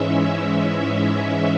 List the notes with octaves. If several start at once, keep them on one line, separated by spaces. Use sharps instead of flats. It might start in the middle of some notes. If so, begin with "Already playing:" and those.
Already playing: G#2 E3 G#3 C#4 E5